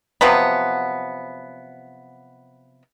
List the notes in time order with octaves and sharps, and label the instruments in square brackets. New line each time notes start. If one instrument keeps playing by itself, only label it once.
[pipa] C3 F3 F#3 B3